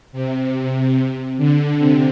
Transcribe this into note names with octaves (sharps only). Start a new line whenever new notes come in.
C3
D3
C3